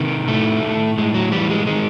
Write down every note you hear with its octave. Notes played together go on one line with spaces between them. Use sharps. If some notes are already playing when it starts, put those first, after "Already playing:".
Already playing: C3 D#3
A2 A3
A2
A2 G#3
F#3
E3 G3
G#3
D#3 G#3